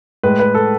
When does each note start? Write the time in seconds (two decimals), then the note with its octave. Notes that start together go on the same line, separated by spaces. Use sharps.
0.23 A2 G#3 B4
0.39 B4
0.54 A4